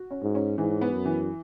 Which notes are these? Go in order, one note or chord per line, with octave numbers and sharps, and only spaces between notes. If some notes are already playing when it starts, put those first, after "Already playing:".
Already playing: F#4
C#4
G#2
C#4
G#2 E3
B3
F#2
E3